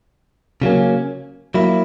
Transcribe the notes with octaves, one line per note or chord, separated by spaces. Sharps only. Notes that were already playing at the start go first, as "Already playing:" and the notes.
C#3 F#3 A#3 C#4
F#3 A#3 E4